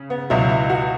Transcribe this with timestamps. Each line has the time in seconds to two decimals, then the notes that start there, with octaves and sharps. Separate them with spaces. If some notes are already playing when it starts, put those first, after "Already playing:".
Already playing: C#3
0.10 B3
0.30 C#2 B2 F#3 E4
0.49 E4
0.70 F#4